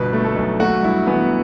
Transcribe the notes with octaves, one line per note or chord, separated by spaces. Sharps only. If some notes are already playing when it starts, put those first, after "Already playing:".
Already playing: G1 B2 B4
A3
A4
B1
A3 F#4
G2 E4
E3 B3